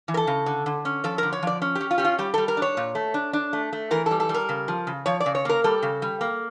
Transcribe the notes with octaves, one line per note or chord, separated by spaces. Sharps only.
E3
A#4
A4
C#3
D3
D3
C#4
F3 A4
D3 A#4
C#5
F3 D5
C#4
G4
C#4
F4
C#4 G4
F4
G3 G4
G3 A4
A#4
D4 C#5
A#2
A3
D4
D4
A3
A3
E3 A#4
A4
G3
A4
G3
A#4
C#3
F3
C#3
F3 C#5
D5
C#3
C#5
A#3 A#4
G3 A4
C#3
G3
A#3